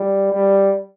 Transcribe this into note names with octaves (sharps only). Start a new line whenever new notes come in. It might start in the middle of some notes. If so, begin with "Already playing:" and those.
Already playing: G3
G3